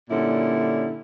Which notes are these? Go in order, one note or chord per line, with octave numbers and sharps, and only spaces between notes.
G2 A#2 D3 C#4 E4